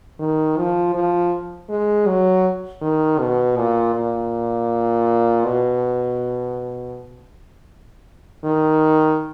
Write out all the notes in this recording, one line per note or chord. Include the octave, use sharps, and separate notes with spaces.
D#3
F3
F3
G#3
F#3
D#3
B2
A#2
A#2
B2
D#3